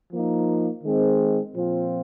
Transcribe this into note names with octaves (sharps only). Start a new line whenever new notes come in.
F3 A#3 D#4
D#3 G#3 C4
A#2 F3 C4 F4